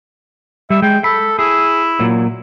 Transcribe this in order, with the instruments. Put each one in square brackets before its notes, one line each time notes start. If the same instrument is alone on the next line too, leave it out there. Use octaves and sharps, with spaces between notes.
[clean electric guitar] G3 [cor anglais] E5
[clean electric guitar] G#3 [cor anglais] G5
[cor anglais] A4 [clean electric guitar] B5
[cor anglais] E4 [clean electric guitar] G#4
[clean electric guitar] A#2 F#3